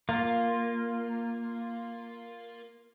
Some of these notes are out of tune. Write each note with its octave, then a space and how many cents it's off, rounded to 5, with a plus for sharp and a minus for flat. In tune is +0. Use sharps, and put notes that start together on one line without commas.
A#3 +0 F4 +0